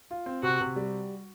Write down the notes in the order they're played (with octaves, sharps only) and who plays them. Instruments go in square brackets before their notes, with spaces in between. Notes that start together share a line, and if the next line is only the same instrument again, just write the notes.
[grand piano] F4
C4
[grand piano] C3 [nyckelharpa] F#4
[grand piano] C3
G3